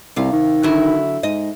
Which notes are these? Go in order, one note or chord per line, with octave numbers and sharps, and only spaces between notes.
C2 C3 F5
D#3
D3 F#3 E4
G#2 D#5